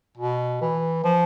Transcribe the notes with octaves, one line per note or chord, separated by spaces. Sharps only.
B2
E3
F3